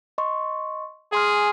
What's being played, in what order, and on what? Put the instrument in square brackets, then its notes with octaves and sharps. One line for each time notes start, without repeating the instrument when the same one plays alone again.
[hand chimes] D#5 C6 C#6
[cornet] G#4 [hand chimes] G#5 C6 F6